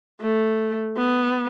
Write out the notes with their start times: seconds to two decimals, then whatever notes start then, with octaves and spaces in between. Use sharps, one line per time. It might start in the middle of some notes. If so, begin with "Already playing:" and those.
0.22 A3
0.97 B3